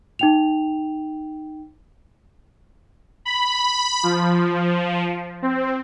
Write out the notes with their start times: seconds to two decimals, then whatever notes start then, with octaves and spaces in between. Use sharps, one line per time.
0.19 D#4 G5 F7
3.25 B5
4.03 F3
5.42 C4